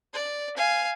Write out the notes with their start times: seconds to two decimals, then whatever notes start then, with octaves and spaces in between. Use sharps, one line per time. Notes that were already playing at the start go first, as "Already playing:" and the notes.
0.14 D5
0.57 F5 G#5